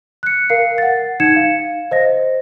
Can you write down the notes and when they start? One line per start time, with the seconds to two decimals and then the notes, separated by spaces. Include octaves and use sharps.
0.23 F#6 C#7
0.50 A#4 F5 C7
0.78 F#5 A6
1.20 D#4 G#6 C#7 E7
1.36 F5
1.91 C5 D#5 A#6